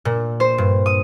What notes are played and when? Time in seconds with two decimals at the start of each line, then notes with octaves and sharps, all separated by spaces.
0.05 A#2
0.40 C5
0.58 G2
0.86 D#6